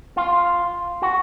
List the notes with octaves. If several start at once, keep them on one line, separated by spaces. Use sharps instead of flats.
F4
F#4